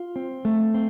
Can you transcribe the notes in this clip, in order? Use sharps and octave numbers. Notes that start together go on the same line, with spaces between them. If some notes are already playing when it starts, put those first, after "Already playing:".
Already playing: F4
C4
A3
C4